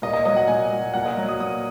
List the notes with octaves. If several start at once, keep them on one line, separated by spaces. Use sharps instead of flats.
A#2 D#5
D#5
F#3 D#5
F#5
A#2 G#5
F#3
A#2 F#5
D#5
F#3
D#6
A#2 D#6